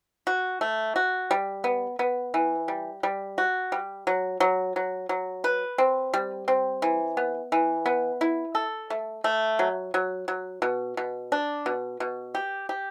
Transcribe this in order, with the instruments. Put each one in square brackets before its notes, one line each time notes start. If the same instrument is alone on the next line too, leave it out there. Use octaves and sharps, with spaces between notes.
[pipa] F#4
A3
F#4
G3
B3
B3
E3
G3
G3
F#4
G3
F#3
F#3
F#3
F#3
B4
C4
G3
C4
E3
B3
E3
B3
E4
A4
A3
A3
F#3
F#3
F#3
B2
B2
D4
B2
B2
G4
G4